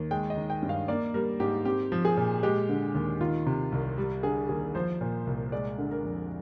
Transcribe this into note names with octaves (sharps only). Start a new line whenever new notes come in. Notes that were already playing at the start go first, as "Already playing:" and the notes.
Already playing: D#2
G#3 G5
D#5
D#3
G5
G2
F5
A#3 D5
G3 A#4
G#2 G4
C4 G4
F3
G#4
A#2
G#3 G4
D3
D#2
D#3 F4
C3
C2
G3
D3 G#4
D#2 G#4
F3 C5
A#2
C2
G#3 D5
D3
A#4
F2